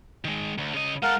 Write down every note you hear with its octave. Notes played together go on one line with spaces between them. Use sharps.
D#3 G#3
D2
C#3 D#5
G#3 A4 A#4 F5 F#5